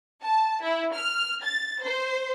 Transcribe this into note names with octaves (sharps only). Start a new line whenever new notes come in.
A5
E4
F6
A6
C5